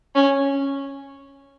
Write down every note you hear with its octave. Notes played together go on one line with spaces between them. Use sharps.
C#4